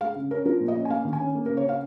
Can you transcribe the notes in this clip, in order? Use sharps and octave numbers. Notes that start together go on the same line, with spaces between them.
G#3 F5
C#3
C#4 A#4
F3 A#4
A#2
D#5
C#4
G#5
A#3 F5
D#3
G#5
C#4
A#3
A#4
C#3
C#5
C#4 F5